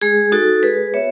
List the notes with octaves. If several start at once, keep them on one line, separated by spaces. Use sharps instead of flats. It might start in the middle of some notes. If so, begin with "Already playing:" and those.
G#3 G#4
D#4 F#4 A4
G#3 G#4 B4
B3 F#4 C#5 E5